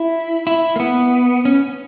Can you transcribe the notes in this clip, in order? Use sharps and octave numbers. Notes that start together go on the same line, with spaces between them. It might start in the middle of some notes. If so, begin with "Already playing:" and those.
Already playing: E4
E4
A#3
B3
C#4